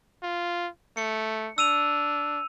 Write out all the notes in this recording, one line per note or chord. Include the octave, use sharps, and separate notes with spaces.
F4
A3 C#7
D4 E6 D#7 F7